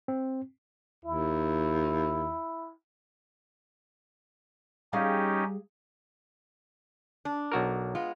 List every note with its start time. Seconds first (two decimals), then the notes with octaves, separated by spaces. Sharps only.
0.08 C4
1.05 D#2 E4
4.93 G3 C#4 D#4 G4 G#4 F5
7.25 D4
7.52 B1 F#4 A#4
7.95 G#3 B3 F4